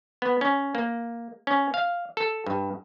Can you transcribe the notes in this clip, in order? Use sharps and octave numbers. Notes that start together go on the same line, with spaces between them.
B3
C#4
A#3
C#4
F5
A4
G2